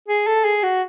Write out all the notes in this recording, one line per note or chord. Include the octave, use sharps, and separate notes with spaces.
G#4
A4
G#4
F#4